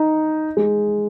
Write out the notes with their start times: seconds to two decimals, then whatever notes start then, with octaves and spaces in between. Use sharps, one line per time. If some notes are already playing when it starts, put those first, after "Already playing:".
Already playing: D#4
0.57 G#3